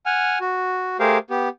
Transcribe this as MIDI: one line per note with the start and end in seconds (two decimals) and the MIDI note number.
0.06 0.39 78
0.06 0.39 80
0.06 0.39 89
0.40 0.97 66
1.00 1.18 57
1.00 1.18 67
1.00 1.18 68
1.00 1.18 70
1.00 1.18 72
1.00 1.18 77
1.30 1.49 59
1.30 1.49 67